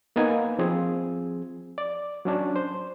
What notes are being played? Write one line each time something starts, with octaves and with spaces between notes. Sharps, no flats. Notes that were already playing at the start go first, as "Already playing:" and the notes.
A#3 B3 D#4 G#5
F3 C4 G#4
D5
F#3 C#4 D4
C5